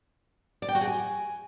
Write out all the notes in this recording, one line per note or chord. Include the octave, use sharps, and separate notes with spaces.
D5
G5
F#4
G#4
G#5